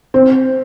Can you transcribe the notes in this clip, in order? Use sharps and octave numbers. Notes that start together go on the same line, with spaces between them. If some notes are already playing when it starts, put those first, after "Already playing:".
C4